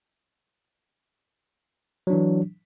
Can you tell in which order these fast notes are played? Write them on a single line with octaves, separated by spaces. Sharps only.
F#3 D4 E3